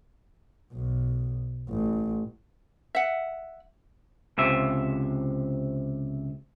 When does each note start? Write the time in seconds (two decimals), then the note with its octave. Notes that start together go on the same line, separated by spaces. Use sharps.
0.73 B1
1.69 A1
2.95 E5 F#5
4.38 C#2 C3 E5